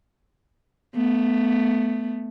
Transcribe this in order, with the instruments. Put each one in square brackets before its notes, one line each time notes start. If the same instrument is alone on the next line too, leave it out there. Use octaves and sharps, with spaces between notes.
[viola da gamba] A3 B3